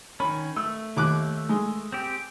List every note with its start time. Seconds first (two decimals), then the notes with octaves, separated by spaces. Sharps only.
0.20 D#3 C#4 B5
0.56 A3 E6
0.96 D#2 D6 F#6
1.49 G#3
1.92 C4 G4